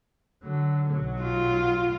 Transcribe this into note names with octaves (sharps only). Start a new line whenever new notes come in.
D3 F#3
B1 F#3
F4